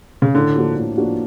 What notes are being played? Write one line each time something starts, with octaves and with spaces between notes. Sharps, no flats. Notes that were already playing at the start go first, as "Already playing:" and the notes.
C#3
A2 D3
F3 A#3 D4 F#4
A2
F3 A#3 D4 F#4